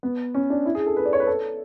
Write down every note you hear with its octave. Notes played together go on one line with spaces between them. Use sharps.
B3
C#4
D4
E4
G#4
A4
B4
D5
C#5
B4
A4